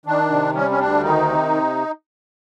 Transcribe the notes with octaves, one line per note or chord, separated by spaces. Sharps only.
D#3 D4
C3
G3 C#4
C#4
D2 D4
D#3 D#4
C3